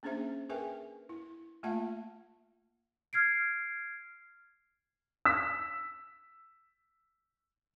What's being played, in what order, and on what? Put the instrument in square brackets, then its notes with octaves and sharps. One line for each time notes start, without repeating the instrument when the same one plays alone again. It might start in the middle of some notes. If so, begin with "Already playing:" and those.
[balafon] A#3 C#4 D4 G#4 C5 E5
G#4 A#4 B4 E5 G5 G#5
E4
A3 A#3 F4 E5 F#5 A5
[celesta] F6 G#6 C7 D7
[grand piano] E6 B6